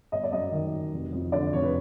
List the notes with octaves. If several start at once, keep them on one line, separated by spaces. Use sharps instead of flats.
G1 D#5
D5
F#2 D#5
D#3
F#3
F1
F2
D3 D5
F1 C#5
B4